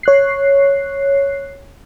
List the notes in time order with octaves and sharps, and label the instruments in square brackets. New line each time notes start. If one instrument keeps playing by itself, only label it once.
[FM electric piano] C#5 F#6 C7